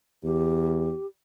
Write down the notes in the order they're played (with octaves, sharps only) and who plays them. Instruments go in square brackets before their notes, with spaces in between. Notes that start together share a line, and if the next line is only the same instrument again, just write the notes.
[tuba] E2 [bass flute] G4